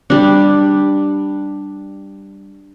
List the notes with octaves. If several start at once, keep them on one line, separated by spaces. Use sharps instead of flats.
G3 D4